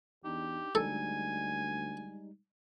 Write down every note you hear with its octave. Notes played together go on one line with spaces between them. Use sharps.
E2 D4 D#4 G4
D2 G3 G#3 D#4 A4 G#5